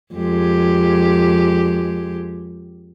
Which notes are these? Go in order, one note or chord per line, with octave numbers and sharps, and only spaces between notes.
F2 G#3 G4